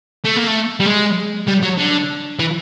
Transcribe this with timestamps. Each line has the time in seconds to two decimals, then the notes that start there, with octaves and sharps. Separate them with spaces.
0.25 A3
0.37 A#3
0.47 A3
0.80 G3
0.86 G#3
1.48 G3
1.63 F#3
1.78 D3
2.39 E3